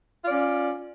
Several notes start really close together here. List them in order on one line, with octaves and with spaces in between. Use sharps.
F4 D5 C#4